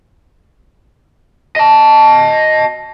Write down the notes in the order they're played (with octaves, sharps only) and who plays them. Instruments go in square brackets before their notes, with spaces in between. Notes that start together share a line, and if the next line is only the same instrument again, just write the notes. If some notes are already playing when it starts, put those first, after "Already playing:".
[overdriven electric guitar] D#5 A5